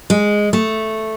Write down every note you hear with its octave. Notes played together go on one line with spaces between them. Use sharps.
G#3
A3